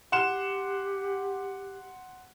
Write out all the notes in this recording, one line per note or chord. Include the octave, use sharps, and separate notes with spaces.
G4 F#5 C6 E7